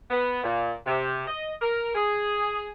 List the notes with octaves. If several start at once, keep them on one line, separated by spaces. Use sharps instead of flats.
B3
A#2
C3
D#5
A#4
G#4